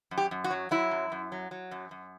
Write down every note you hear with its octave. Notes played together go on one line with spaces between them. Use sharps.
F#2
G4
F#2
F#4
F#3
F#3 E4
F#2
F#2
F#3
F#3
F#2
F#2